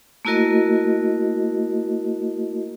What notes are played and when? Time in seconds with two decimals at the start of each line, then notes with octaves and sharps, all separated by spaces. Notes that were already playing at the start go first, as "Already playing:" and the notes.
0.25 A3 A#3 E4 F#4 A#4 D#5